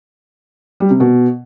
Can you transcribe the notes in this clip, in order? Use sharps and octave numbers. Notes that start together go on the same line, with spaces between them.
G3
C3
B2